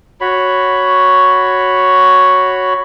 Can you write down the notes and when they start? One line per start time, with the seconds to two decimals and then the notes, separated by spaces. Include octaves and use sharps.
0.21 F#4 C#5 B5